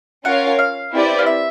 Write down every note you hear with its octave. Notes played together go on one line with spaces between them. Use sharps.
C#4 F4 A#4 C#5 F5 F#5
F5
C4 E4 G4 B4 D5
F5
E5